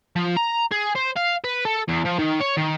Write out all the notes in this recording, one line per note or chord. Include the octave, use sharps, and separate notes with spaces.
F3
A#5
G#4
C5
F5
B4
A4
E2
F3
D#3
C#5
D#3